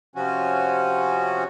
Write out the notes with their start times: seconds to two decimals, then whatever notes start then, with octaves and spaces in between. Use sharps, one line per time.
0.16 C3 F3 C#4 F#4